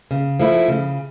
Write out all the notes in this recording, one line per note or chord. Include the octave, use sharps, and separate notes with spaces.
C#3
F3 A3 E4
C#3